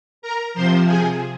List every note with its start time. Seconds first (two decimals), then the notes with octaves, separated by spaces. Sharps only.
0.22 A#4 A#5
0.54 C3 F3 C5 C6
0.86 G#4 G#5